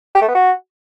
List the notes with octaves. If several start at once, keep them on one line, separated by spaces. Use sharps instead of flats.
G4
A3
B3
F#4